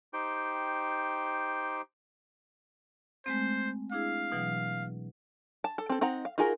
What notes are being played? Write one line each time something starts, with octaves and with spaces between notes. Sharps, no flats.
D#4 G4 C5 G5
G#3 A3 C4 C5
D4 E4 G#4 F5
B2 E3 F#3
A5
A4
C4 A4
C4 D#4 F#5 A#5
F5
D#4 F4 F#4 G#4 A#4